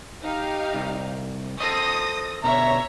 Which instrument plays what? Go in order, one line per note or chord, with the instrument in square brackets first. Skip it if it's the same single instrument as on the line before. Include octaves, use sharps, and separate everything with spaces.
[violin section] D#4 G4 F5
[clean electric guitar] C2
[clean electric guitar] A4 C5 D#5 [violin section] D#6 A#6
[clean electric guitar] B2 D3 [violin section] C#5 E5 [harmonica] A#5